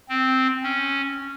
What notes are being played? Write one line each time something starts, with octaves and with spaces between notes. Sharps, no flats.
C4
C#4